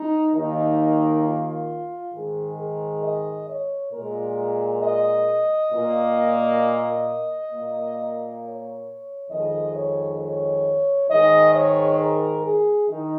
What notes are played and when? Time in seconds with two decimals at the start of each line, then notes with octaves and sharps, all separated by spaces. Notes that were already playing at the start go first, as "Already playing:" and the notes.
Already playing: D#4
0.34 D#2 D#3 A#3 D#4
1.24 F4
2.13 G#2 D#3 G#3 G#4
2.58 A#4
3.03 D#5
3.48 C#5
3.93 A#2 G#3 A#4
4.82 D#5
5.72 A#2 A#3
7.51 A#2 A#3
8.40 C#5
9.30 F2 D#3 G#3 D#5
9.75 C#5
10.20 C#5
11.09 G#2 D#3 G#3 D#5
11.54 C#5
11.99 A#4
12.44 G#4
12.89 D#3 D#4